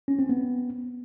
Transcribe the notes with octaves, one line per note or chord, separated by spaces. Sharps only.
C#4
C4
B3